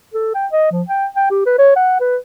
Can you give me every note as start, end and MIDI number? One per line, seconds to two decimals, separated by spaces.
0.14 0.31 69
0.35 0.47 79
0.52 0.69 75
0.71 0.82 53
0.89 1.06 79
1.16 1.26 79
1.30 1.46 67
1.46 1.56 71
1.58 1.71 73
1.76 1.98 78
2.00 2.17 71